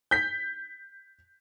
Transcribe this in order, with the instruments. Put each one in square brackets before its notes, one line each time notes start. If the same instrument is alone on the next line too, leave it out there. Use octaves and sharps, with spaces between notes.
[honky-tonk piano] G6 B6